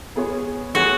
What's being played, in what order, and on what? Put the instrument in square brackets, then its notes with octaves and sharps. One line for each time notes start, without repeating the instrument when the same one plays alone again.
[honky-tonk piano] B3 G#4 C#5
[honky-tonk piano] B3 G#4 C#5 [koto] F#4